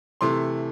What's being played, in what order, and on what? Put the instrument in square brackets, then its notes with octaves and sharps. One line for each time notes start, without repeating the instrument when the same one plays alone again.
[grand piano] C3 E3 A3 C6